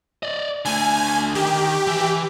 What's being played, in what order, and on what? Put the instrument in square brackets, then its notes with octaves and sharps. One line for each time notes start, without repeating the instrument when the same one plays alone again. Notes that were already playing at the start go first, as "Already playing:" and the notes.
[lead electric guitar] D5 D#5
[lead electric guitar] D3 A3 [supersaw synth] G#5
[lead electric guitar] D#3 [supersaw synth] G4
[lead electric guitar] E3